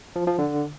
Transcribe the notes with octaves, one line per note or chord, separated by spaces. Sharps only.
F3
F3
D3